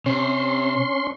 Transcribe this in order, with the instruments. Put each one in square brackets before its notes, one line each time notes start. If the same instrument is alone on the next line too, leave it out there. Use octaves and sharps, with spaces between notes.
[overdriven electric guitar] C3 [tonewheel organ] C#4 C6